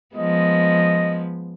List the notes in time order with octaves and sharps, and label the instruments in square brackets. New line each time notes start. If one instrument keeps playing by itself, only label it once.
[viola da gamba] F3 G#3 B3 [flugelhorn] D#5